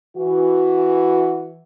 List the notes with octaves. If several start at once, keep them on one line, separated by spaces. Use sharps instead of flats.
E3 F#4